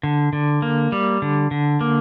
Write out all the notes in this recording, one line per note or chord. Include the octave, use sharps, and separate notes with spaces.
D3
D3
A#3
G3
D3
D3
A#3